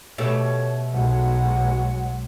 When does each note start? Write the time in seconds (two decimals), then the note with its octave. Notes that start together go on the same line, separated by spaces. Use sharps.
0.18 B2 A3 G4 C#5
0.93 B1 F#3 G#3 F#5